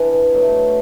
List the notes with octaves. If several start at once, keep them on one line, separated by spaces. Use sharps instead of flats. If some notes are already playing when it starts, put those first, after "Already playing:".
Already playing: E3 B3 D4
B2 F#3 A3